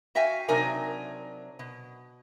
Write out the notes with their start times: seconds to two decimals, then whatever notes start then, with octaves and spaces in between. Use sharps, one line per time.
0.15 F#4 E5 F5 G5 G#5
0.48 C3 F#3 D4 D#4 A#4 G#5
1.59 B2